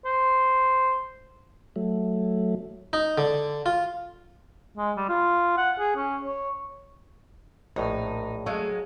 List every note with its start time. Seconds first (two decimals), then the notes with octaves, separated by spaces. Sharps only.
0.05 C5
1.76 F#3 A3
2.93 D#4
3.18 D3
3.66 F4
4.78 G#3
4.97 G3
5.09 F4
5.57 F#5
5.79 G#4
5.96 C#4
6.25 C#5
7.76 A#1 A2 D#4
8.46 F#3 G#3 A3 F5